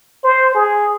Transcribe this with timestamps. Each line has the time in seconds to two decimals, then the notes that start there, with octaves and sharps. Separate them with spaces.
0.24 C5
0.55 G#4